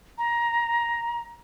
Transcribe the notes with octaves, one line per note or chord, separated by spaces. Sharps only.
A#5